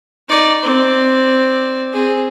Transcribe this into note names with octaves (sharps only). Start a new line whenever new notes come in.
D#4 D5
C4 D5
C4 G#4